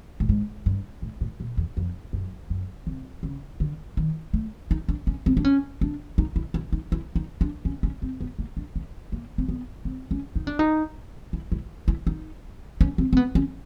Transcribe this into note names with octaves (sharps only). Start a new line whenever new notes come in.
A2
G#2
G2
A2
A2
A#2
E2
F2
F#2
F#2
C3
C#3
D3
D#3
A3
D#4
D4
C#4
C4
D4
C#4
D4
D#4
E4
E4
D#4
E4
D#4
D4
C#4
C#4
C4
B3
A#3
D4
C#4
A#3
C4
B3
C4
C#4
D#4
D4
D#4
E4
E4
E4
D#4
C#4
C4
C4
B3
C#4